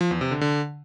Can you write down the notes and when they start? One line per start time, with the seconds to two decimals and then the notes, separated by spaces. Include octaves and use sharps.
0.01 F3
0.11 E2
0.21 C3
0.31 D3
0.41 D3